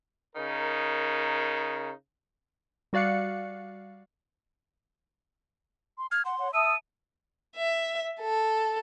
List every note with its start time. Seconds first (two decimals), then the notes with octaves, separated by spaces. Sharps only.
0.35 C#3 D#4 A#4
2.93 G3 F#4 D5 F5 F#6 C#7
5.98 C6
6.11 F6 G#6
6.25 F#5 C6
6.39 C#5 F#5
6.54 E5 A5 D#6 E6 D#7
7.56 E5
8.20 A4